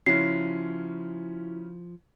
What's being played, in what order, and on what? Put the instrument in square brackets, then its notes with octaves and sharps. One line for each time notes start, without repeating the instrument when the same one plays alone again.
[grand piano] C#3 C#4 [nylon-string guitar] F3 [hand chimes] E4 F#4 [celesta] C7